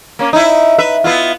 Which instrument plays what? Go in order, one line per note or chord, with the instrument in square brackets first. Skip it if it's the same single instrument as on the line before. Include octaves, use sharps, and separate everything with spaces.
[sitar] A#3 C#4
D#4 E4
B4 E5
B3 E4 F4